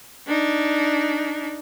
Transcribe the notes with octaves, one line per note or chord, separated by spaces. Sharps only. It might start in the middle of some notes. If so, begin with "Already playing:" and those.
D4 D#4